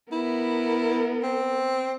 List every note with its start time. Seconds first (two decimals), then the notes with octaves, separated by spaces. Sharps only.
0.12 B3 E4 A#4
1.23 C4